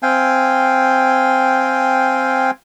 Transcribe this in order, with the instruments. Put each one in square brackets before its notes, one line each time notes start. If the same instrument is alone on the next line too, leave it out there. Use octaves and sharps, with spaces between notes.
[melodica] C4 F5 G5 G#5